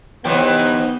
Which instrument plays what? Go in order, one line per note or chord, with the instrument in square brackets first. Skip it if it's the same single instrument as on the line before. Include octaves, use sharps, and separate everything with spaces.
[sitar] C3 E3 F#3 [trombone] B3 [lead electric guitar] D#4 G5